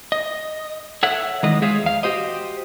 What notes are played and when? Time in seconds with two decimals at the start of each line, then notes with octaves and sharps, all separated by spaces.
0.12 D#5
1.03 A4 C#5 E5 F#5
1.43 D#3 E3 G#3 D#5
1.62 G#3 G#4 C5 C#5 E5 F5
1.83 E2 F5
2.03 F#4 G4 C5 D#5